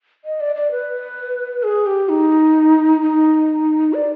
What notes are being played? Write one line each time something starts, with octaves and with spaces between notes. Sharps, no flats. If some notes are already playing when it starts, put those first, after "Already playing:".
D#5
D5
D5
B4
G#4
G4
D#4
D#4
D5